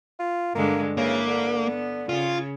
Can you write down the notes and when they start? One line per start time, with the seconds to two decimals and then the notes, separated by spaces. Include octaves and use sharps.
0.19 F4
0.55 G2 D3 G#3 A#3
0.97 C#3 A#3 E4 B4
1.28 D3
1.63 B3
2.09 C#3 F4